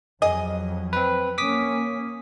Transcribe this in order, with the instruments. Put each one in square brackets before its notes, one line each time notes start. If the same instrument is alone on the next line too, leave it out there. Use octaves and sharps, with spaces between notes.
[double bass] F2 F#3 [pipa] G#4 D#5
[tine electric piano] C4 B4
[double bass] A#3 C#4 [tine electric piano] D6 D#6 B6